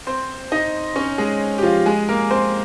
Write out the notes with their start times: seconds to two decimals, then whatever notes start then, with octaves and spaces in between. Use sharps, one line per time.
0.07 C4 C5
0.52 D#4 D#5
0.96 C#4 C#5
1.18 G#3 G#4
1.58 G4
1.63 F3 F4
1.86 G#3 G#4
2.09 A#3 A#4
2.30 C4 C5